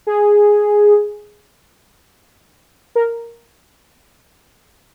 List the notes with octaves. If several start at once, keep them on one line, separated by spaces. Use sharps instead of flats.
G#4
A#4